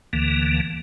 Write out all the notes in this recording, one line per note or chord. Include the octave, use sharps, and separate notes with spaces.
D2 D3 E3 A#3